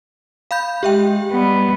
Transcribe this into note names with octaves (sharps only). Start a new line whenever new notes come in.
F5 B5 G6
G#3 G4 E5 G5
G3 B3